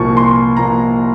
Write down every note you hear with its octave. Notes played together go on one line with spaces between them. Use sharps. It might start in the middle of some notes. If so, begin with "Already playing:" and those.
Already playing: C2 A#2 F3 C#6
C6
A#2 F3 A#5